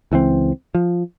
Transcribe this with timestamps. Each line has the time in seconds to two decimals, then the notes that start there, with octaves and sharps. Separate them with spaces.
0.12 C#2 E3 A3 C4
0.75 F3